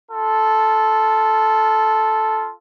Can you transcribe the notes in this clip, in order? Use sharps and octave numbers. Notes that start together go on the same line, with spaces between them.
F4 A4